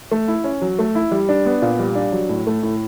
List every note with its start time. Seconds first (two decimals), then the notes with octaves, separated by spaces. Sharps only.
0.11 A3
0.28 E4
0.44 C#4
0.61 F#3
0.79 A3
0.95 E4
1.11 G3
1.29 D4
1.45 B3
1.62 A#2
1.79 G3
1.95 D4
2.12 F#3
2.29 A2
2.47 A3
2.63 A2